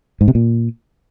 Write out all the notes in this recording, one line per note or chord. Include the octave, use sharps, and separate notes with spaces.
G#2
C3
A#2